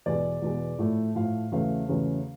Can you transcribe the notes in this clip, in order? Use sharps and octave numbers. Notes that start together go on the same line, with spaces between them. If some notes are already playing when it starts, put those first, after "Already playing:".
E2 B2 G#3 D5
E2 B2 G#3
A2 F3 A3
A2 F3 A3 F5
E2 C#3 F#3 A3 F5
E2 C#3 F#3 A3